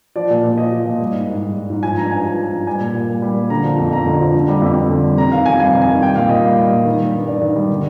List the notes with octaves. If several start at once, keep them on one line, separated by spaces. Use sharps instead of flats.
F3 D5
A#2
A#2
F3 D#5
F3
A#2
G3
G#2
G#2
G3
G3
G#2
F3 G#5
G2 A#5
G2 G#5
F3
F3
G2
G3 G#5
A#2
A#2
G3
G3
A#2
D3 A#5
F3
F2
F2 A#5
D3
F3
D3
G3
F2
F2
D3
G3
C3 A#5
D#3 F5
F2 G#5
G3 G#5
C3
G#5
D#3
G3 G5
A#2 F5
A#2 D#5
G3
G3
A#2
D#3
G3
G2
G2 D5
D#3
G3
D3